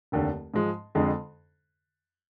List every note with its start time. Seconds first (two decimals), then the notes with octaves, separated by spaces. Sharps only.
0.12 F1 D#2 D3
0.54 G#2 F3 G#3
0.95 F2 D3 G#3